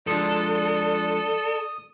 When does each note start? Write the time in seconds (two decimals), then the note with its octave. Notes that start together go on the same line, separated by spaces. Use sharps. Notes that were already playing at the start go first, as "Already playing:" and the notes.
0.07 F3 G#3 D4 A4 D5 D#6